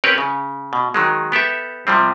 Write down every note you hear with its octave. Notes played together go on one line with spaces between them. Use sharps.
C4 C#4 G4 A#4 B4 C#5
C#3
B2
D#3 F#3 G#3
B3 G4 A4 E5
C3 F3 G3 C4